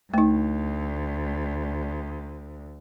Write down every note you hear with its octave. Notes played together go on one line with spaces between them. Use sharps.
D2 A3 D#4